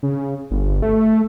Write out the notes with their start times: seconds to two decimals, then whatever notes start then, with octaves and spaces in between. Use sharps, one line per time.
0.03 C#3
0.51 G1
0.82 A3